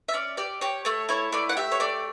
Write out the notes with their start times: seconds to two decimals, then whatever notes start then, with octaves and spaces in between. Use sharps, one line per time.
0.08 E5
0.14 C#4 D5
0.37 G4 D5
0.61 G4 C#5
0.85 A3 C#5
1.09 E4 C#5
1.32 A3 D5
1.49 F#5
1.57 G4 E5
1.72 C#5
1.80 A3 D5